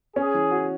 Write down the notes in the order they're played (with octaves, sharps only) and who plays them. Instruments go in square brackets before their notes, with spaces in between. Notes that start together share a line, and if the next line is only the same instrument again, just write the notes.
[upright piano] C#4 [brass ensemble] G#4
[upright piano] E3
F#4